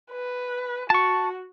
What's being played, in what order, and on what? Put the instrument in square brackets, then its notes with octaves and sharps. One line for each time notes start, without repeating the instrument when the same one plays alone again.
[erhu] B4
[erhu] F#4 [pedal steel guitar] A5 C#6